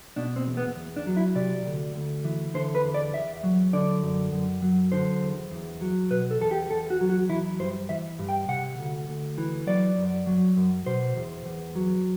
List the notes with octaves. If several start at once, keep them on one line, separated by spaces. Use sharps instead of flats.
B2 D4
C4
E2
B3
E2
D4
F#3
E4
C3 D5
D2
D2
E3
D3 C5
B4
E2
D5
E2 E5
F#3
D3 D5
F#2
F#2
F#3
D3 C5
E2
E2
F#3
B2 B4
A4
E2 A4
G4
E2 A4
F#4
F#3
F#4
E3 E4
G2 C5
E3 E5
G2
G5
C3 F#5
D2
D2
E3
F#3 D5
F#2
F#3
F#2
B2 C5
E2
E2
F#3